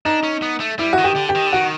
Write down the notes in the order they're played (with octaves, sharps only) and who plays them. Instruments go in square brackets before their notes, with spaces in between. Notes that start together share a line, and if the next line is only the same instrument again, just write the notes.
[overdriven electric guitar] D4 [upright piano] D#4
[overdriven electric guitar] C#4
B3
A3
[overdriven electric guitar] G3 [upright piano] E4
[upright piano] F#4
[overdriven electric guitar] D#3
[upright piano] G4
[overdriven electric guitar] D3
[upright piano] G4
[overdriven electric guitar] D#3
D3
[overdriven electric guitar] D#3 [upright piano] F#4